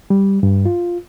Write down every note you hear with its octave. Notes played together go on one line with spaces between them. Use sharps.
G3
G2
F4